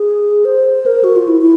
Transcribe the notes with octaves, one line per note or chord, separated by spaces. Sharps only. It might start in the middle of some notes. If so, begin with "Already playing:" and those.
Already playing: G#4
C5
A#4
F#4
F4
E4
E4